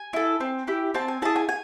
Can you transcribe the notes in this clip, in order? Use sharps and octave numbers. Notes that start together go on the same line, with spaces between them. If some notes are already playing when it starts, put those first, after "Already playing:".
Already playing: G#5
E4 A4
C4
E4 G4
C4 A5
G#5
E4 G#4 A5
G#5
G#5